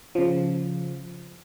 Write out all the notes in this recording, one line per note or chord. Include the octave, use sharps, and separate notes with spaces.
C#3 F3